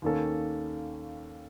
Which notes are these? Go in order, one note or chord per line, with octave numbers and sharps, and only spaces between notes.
D#2 D#3 A#3 C#4 A4